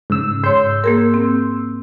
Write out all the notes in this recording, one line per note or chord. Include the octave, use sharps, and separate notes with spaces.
G#2 C#3 E6
G#2 C#5 C6 E6 G6
A#3 G#4 A#4
C4